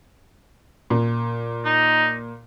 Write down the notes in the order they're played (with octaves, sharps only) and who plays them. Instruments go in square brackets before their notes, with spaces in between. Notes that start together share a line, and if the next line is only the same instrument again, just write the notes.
[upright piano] A#2
[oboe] D#4